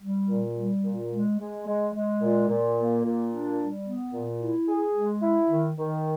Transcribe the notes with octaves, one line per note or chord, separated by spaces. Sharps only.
G3
A#2
G3
A#2
G#3
G#3
G#3
G#3
A#2
A#2
A#3
A#2
D4
G3
B3
A#2
E4
G#4
G#3
E4
D#3
D#3